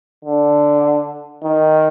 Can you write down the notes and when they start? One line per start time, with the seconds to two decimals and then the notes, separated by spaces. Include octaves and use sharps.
0.25 D3
1.44 D#3